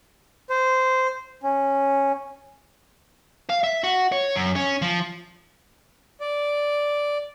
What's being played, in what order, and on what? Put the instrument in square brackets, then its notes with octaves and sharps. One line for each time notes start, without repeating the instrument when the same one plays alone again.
[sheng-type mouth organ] C5
C#4
[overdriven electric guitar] F5
E5
F#4
C#5
F#2
C#4
F3
[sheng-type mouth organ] D5